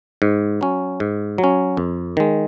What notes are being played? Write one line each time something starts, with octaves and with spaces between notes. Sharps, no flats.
G#2
F#3 C#4
G#2
F#3
C#4
F2
D#3 G#3